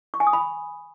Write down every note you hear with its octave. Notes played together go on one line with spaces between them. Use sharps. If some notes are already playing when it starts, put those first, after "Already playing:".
C#6
G#5
D#6
B5